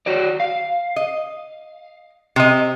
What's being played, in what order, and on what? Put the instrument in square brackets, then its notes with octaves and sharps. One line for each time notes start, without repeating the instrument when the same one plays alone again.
[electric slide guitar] F#4 C#5 D5
F5
[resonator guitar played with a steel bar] D#5
C3 D#5